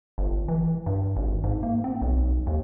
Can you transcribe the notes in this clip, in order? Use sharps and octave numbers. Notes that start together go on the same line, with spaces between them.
G1
E3
G2
G#1
G#2
A#3
C4
B1
D#2